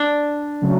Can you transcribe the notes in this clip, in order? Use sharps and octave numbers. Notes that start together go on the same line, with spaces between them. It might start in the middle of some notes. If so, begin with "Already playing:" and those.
Already playing: D4
C#3 F#3 A3